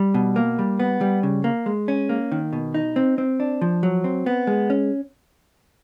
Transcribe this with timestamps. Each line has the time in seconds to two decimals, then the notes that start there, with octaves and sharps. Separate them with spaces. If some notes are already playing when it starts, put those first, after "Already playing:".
Already playing: G3
0.14 B2
0.36 A#3
0.59 G3
0.80 B3
1.01 G3
1.23 C#3
1.44 A#3
1.66 G#3
1.88 C#4
2.09 A#3
2.32 D#3
2.53 B2
2.74 D#4
2.96 C4
3.18 C4
3.40 D4
3.61 F3
3.83 F#3
4.04 C4
4.26 B3
4.47 G#3
4.70 C#4